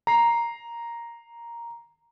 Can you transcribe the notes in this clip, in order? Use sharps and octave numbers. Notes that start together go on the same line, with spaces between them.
A#5 C7